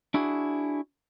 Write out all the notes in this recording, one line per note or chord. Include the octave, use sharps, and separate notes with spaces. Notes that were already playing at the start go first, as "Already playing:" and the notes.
D4 E4 F#4 G#4